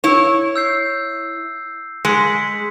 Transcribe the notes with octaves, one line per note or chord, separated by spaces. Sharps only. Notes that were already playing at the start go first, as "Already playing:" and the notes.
E4 C#5
E6 G6 C7
G#3 B6 C#7